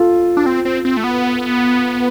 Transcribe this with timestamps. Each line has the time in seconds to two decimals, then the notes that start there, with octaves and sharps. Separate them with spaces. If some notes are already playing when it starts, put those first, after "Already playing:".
Already playing: F4 A4
0.37 D4
0.46 C4
0.65 C4
0.85 C4
0.97 A3
1.04 B3